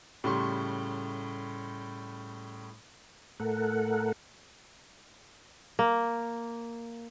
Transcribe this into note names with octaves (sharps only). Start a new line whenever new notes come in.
A2 C#3 G3 C6 C#6
A2 A3 A4 A#4 F#5
A#3